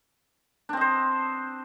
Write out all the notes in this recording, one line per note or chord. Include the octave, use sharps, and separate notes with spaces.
C4 D4 C5 D#5